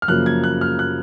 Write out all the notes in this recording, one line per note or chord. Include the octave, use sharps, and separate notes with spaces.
F6
F#2 C#3 F3 A#3 F#6
G#6
F#6
F6
F#6